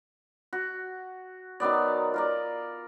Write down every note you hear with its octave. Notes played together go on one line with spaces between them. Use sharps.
F#4
D#3 F#3 B3 D5
F4 A#4 D5